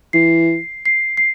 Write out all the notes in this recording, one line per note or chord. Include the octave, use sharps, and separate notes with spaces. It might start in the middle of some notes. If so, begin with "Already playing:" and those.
E3 C7
C7
C7